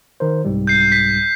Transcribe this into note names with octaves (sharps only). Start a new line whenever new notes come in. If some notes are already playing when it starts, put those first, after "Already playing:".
D#3 A#4 C5
C2 G#2 G3
G6 C7
B6